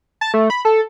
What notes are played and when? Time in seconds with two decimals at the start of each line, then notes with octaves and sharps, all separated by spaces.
0.21 A5
0.34 A3
0.50 B5
0.65 A4